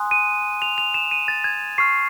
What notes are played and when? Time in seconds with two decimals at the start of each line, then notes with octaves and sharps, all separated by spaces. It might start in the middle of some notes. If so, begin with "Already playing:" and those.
Already playing: G#5 C6 D#6 F#6
0.11 D#7
0.62 F7
0.78 F7
0.94 E7
1.11 D#7
1.28 A6
1.44 G#6
1.78 C#6 F6 C7